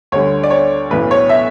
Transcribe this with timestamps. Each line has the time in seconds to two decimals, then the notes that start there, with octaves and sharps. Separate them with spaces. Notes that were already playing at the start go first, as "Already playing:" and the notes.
0.12 D2 D3 G3 C#5
0.44 D5
0.50 C#5
0.90 B1 A2 E3 B4
1.11 C#5
1.29 E5